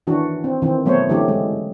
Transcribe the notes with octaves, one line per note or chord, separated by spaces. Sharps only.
D#3 E3 D4 F#4
C4
D#3 E3 C4
F#3 A3 B3 C5 C#5
D3 E3 F#3 A3 G4
G#3